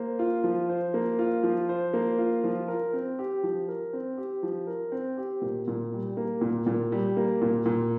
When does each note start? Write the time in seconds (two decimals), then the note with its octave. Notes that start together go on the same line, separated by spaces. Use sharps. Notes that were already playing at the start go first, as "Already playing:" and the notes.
Already playing: A#3 C5
0.19 F4
0.44 F3
0.69 C5
0.94 A#3
1.19 F4
1.43 F3
1.69 C5
1.94 A#3
2.19 F4
2.44 F3
2.68 A#4
2.93 C4
3.19 G4
3.43 F3
3.68 A#4
3.93 C4
4.18 G4
4.43 F3
4.67 A#4
4.92 C4
5.17 G4
5.42 A#2
5.68 A#2
5.92 G3
6.17 A#3
6.41 A#2
6.67 A#2
6.92 G3
7.17 A#3
7.42 A#2
7.66 A#2